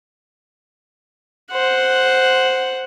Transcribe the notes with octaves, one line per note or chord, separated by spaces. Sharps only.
C5 F#5